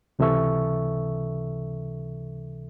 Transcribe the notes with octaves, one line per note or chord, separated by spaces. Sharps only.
C#2 C3 E3 A4 E5 C#6